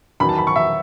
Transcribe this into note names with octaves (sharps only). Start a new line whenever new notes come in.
E2 D#3 F#3 B5
A5
B5
C#6
E5